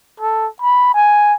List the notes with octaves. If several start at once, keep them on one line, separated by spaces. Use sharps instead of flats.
A4
B5
G#5